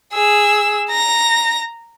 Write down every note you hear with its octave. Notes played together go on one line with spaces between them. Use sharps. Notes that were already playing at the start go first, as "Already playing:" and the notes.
G#4 E6
A#5 A#6